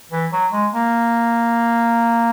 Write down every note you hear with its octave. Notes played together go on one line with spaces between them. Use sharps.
E3
F#3
G#3
A#3